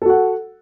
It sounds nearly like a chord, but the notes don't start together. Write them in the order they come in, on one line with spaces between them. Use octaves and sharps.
A4 F#4 F#5